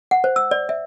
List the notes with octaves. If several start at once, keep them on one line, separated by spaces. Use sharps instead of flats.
F#5
C5
E6
D5
E5